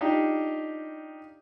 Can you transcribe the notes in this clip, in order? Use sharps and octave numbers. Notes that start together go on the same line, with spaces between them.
D4 D#4 F4 G4